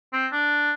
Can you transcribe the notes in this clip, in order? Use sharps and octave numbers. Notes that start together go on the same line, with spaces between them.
C4
D4